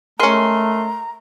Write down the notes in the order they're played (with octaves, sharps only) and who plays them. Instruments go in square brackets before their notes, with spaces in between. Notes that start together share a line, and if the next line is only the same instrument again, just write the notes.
[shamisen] G#3 C#4 [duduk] A3 [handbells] A#4 C6 C7 [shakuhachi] A#5